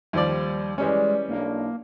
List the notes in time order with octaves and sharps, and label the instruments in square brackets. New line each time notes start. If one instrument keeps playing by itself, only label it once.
[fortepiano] D#2 F3 D5 [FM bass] G3
[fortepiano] E3 G3 C#4 [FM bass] G#3 [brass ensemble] D5
[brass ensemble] B1 D4 E4 [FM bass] A#3